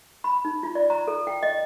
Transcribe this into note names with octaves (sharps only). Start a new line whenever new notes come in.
B5
D#4
F4
D5
A#5
A4
G5
D#5